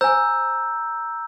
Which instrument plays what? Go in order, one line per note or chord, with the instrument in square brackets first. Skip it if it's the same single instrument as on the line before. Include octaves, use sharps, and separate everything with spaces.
[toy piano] C5 G#5 [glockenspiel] A#5 E6 G6